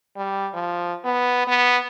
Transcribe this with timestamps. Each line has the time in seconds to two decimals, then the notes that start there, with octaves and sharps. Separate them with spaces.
0.17 G3
0.54 F3
1.05 B3
1.48 B3